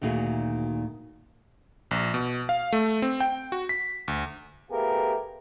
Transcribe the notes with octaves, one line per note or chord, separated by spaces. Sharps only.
D2 A#2 D#3 F#4 G#4
A#1
B2
F5
A3
C4
G5
F#4
B6
D2
A3 B3 F4 G4 G#4 A#4